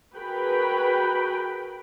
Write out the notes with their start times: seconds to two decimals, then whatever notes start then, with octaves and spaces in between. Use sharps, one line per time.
0.15 F#4 G#4 A#4 B4 G5 B5